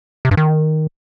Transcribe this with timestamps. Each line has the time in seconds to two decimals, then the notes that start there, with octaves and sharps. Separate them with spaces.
0.25 C3
0.31 G2
0.37 D#3